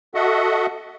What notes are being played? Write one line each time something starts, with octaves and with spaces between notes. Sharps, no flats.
F#4 A4 D#5 E5 F#5